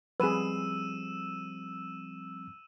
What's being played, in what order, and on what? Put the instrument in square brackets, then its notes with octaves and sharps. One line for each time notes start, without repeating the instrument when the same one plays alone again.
[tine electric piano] F3 G3 C4 [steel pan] G#4 B4 [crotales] E6 D#7 E7